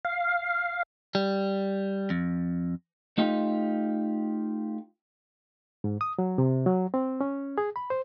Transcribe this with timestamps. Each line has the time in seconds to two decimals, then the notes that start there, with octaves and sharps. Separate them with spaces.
0.05 F5
1.15 G3
2.10 F2
3.18 A3 D#4 F4 G4
5.84 G#2
6.01 D#6
6.19 F#3
6.38 C3
6.66 F#3
6.94 C4
7.21 C#4
7.58 G#4
7.76 B5
7.90 C5